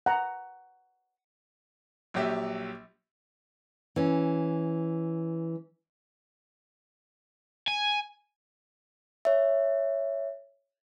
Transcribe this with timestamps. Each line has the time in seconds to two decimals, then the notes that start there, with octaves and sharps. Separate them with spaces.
0.06 F#5 A#5
2.14 A#1 F#3 G4 E5
3.96 E3 C#4
7.68 G#5
9.25 C#5 E5